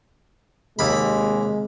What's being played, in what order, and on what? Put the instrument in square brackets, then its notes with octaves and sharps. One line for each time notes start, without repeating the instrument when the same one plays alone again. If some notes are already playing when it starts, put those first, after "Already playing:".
[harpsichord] D#2 B5 [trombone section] C3 G#3